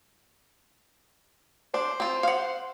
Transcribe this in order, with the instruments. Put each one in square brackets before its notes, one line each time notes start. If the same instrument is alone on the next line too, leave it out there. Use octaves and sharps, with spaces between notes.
[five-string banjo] D4 [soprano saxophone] C5
[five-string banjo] C4 F4
F5 F#5